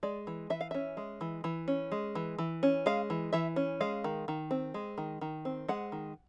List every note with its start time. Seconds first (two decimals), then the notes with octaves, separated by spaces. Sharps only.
0.03 G#3 D5
0.27 E3
0.50 E3 E5
0.61 F5
0.71 C#4 E5
0.97 G#3
1.21 E3
1.44 E3
1.68 C#4
1.92 G#3
2.15 E3
2.38 E3
2.63 C#4
2.86 G#3 F5
3.10 E3
3.33 E3 E5
3.56 C#4
3.81 G#3 F5
4.04 D#3
4.28 D#3
4.51 C4
4.74 G#3
4.98 D#3
5.21 D#3
5.45 C4
5.68 G#3 F#5
5.92 D#3